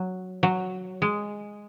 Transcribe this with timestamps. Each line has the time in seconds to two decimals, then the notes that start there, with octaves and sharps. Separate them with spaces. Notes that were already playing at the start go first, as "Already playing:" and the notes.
Already playing: F#3
0.43 F#3
1.02 G#3